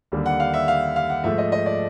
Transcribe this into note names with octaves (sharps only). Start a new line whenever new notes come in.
D#2 D3 G3 A#3
F#5
F5
E5
F5
F5
F#5
G#2 F3 A3 E5
D#5
D#5
D5